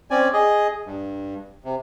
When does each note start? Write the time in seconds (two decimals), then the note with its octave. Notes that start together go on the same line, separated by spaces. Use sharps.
0.11 C4 C#4 D5 G#5
0.33 G#4 D#5
0.86 G2
1.65 C3